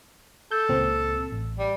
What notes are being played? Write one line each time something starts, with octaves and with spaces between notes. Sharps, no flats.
A4 G6
C#2 A#2 C4
A1
G3